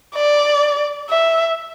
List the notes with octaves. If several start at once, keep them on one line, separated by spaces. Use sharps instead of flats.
D5
E5